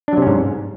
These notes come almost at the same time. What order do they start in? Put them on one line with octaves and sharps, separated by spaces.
D4 F#3 C3 C#4 G#2